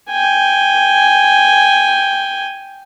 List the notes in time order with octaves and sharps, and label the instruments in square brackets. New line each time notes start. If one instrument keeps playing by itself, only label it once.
[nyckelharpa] G5 G#5